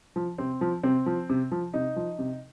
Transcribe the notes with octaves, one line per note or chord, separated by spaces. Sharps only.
F3
C3 C4
F3
C3 C4
F3
C3
F3
C3 D#4
F3
C3